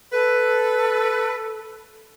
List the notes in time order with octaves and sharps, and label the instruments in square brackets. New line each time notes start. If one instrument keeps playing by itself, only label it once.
[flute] A4 [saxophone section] B4